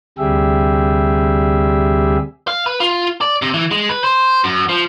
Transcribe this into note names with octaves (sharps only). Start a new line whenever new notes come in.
D2 C3 G3 G4 G#4 E5
F5
B4
F4
D5
C3
E3
G#3
B4
C5
F#2
F3